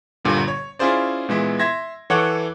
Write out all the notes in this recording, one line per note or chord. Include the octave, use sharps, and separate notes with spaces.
G1 A#2 D3 G3
C#5
C#4 E4 F4 G#4 C5 D5
A#2 E3 G#3 B3 E4
E5 C6 G#6 A#6
E3 A4 C#5 F#5 D6 F#6